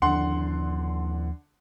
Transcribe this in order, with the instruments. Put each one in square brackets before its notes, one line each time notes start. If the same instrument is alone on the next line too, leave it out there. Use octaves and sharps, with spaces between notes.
[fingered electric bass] D#2 F3 [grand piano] D3 F#5 C6